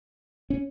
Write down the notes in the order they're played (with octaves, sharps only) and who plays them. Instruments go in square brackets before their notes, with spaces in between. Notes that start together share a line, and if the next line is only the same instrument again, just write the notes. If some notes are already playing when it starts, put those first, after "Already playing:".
[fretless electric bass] C#4